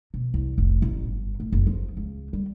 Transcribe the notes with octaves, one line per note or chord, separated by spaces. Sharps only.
B2
C2
F1
A1
G1
A2
F#1
F3
C#2
G3